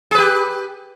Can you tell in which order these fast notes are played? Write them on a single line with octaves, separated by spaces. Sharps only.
G#4 B4 G4